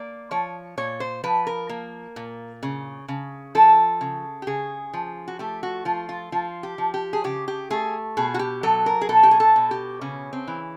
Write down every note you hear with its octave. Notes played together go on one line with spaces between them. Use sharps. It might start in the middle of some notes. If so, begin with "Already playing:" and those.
Already playing: A#3 D5
F3 C#5
A#2 C#5
C5
F3 B4
A#4
A#3
A#2
C#3
C#3
F3 A4
C#3
G4
C#3 G#4
F3
F#4
A3 G4
F#4
F3 F4
F4
F3 F4
G4
F3
G4
G#4
C#3 G4
G4
A3 G#4
B2 G#4
F#4
G4
F#3 A4
A#4
G#4
B2 A4
G4
G#4
A4
B2
G4
C#3 C#4
C4
E3